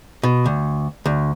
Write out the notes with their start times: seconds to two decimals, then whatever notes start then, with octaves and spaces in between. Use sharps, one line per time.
0.23 B2
0.46 D2
1.06 D2